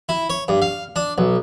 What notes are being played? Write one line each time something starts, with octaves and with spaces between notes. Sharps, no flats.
E4
C#5
G2
F5
D4
B1